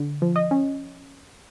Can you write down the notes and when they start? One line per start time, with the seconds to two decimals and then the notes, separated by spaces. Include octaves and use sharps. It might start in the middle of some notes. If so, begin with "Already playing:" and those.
Already playing: D3
0.22 F3
0.36 D#5
0.51 C#4